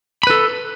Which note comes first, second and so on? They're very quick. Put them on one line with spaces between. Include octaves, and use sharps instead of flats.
B5 B4 A4